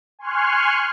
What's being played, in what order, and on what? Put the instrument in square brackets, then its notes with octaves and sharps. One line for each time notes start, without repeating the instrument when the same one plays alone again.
[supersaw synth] G#5 C6 C#6 F6 F#6